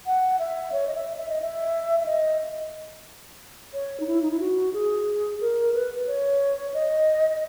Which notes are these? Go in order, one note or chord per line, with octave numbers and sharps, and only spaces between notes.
F#5
E5
C#5
D#5
E5
E5
D#5
E5
E5
D#5
C#5
D#4
E4
D#4
E4
F#4
G#4
A#4
B4
C#5
D#5